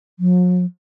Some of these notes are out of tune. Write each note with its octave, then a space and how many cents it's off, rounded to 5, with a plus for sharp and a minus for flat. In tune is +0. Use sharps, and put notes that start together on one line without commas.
F#3 -45